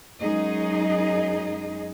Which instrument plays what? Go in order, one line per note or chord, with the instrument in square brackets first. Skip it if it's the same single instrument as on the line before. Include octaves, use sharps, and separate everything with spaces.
[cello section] F#2 G#3 D#4 G#4 D#5